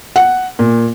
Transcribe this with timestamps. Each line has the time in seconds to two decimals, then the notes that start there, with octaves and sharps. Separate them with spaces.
0.16 F#5
0.59 A#2